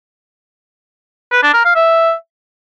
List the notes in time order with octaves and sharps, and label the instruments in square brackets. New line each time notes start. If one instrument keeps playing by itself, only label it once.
[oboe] B4
D4
A#4
F5
E5